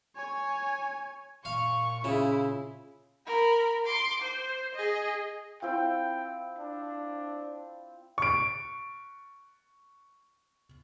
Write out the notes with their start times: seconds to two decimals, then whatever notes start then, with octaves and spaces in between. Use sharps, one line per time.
0.16 C#5 G#5
1.45 A#2 F5 C#6
2.04 C#3 E4 F4 G#4
3.27 A#4 B5
3.85 C6 D6
4.22 C5
4.75 G#4 D#5
5.62 C4 E4 F4 G5
6.58 D4
8.18 C#6 D7